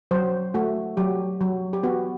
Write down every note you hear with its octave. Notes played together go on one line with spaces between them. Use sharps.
F#3 C5
A3 F#4
F#3 G4
F#3
G4
B3 F#4